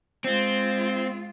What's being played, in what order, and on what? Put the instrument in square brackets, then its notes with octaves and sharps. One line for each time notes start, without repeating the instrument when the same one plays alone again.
[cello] G#3 F4 [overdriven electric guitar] C4